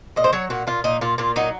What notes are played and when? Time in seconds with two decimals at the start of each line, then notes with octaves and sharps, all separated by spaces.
0.16 A#2 D#5
0.24 C5
0.33 F#3 C#5
0.50 A#2 F#4
0.67 A#2 F4
0.84 A#2 D#4
1.01 A#2 F4
1.18 A#2 F4
1.36 F#3 D#4